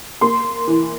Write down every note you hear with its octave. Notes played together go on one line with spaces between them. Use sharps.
A#3 C6
E3